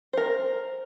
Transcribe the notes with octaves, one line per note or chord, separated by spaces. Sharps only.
A#4 C5